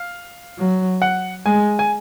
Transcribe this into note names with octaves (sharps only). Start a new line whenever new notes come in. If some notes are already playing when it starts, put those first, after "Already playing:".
Already playing: F5
F#3
F#5
G#3 G#5
G#5